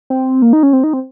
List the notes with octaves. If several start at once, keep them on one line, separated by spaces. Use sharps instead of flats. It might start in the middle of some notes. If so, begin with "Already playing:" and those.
C4
A#3
D#4
C#4
C4
D#4
C4